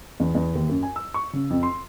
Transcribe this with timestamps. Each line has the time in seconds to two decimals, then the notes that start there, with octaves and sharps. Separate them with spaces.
0.20 E2
0.35 E2
0.55 D#2
0.69 F#2
0.83 G#5
0.96 E6
1.14 C#6
1.33 C#3
1.50 F2
1.63 C6